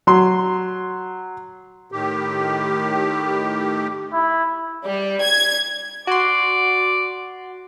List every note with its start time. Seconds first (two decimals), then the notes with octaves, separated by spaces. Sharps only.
0.07 F#3 C6
1.92 A2 D#3 G4
4.13 E4
4.86 G3
5.22 G#6
6.07 F#4 D5 C6